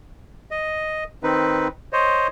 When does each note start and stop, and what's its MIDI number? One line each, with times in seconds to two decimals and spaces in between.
0.51 1.04 75
1.23 1.68 51
1.23 1.68 60
1.23 1.68 63
1.23 1.68 71
1.93 2.28 72
1.93 2.28 73
1.93 2.28 75